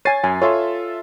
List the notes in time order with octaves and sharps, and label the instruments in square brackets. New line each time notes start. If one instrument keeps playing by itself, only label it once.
[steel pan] C#5 G#5 [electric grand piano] A6 C7 D#7
[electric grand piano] F#2 [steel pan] G#5
[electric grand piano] F4 A4 E5 [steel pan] C#5 G#5 C6